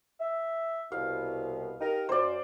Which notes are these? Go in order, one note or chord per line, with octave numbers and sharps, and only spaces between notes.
E5
C2 B2 F5
D#4 G4 A#4
F#2 C5 D5